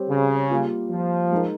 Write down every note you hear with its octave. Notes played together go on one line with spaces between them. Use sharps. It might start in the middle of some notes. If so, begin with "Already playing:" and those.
Already playing: G3 C4 G4 C#5
C#3
G3 A#3 F4
F3
G#3 D#4 A#4